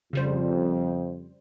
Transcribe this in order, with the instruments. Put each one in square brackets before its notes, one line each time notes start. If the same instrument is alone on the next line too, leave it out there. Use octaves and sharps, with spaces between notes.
[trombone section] F2 [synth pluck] C#3 G3 C5